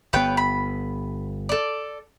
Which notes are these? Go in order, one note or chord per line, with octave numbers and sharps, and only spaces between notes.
G1 B3 B4 C#5 G5
B5
A4 D5